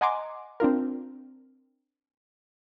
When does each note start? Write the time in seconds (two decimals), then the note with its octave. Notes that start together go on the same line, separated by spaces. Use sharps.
0.01 D#5 F#5 G#5 A#5 C6 D6
0.60 C4 D4 F4 A#4